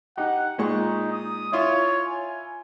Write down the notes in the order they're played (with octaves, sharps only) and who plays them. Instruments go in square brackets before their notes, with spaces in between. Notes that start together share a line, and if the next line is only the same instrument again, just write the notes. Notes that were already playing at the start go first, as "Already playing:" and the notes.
[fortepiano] D#4 G4 [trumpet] F#5
[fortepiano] A#2 G#3 C#6 [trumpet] D#4
[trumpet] D#6
[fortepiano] E4 F4 E5 [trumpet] C#5
[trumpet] G#5